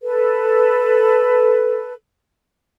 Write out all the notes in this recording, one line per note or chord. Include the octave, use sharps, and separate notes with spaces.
A4 B4